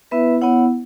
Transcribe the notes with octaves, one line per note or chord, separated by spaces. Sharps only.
B3 E4 B4 E5
B3 E4 C#5 F#5